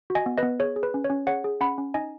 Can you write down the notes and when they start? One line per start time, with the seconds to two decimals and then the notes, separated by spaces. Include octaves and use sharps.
0.10 F#4
0.15 D#5 G#5
0.26 B3
0.38 B4 D#5
0.43 B3
0.60 G#4 C#5
0.76 G#4
0.83 B4
0.94 C#4
1.04 C#5
1.10 C#4
1.27 G#4 C#5 F#5
1.44 G#4
1.61 C#4 F#5 B5
1.78 C#4
1.94 D#4 D#5 G#5